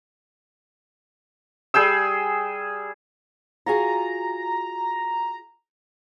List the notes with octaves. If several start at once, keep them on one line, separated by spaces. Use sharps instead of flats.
G3 G#4 G5 E6
F4 F#4 G#4 A#5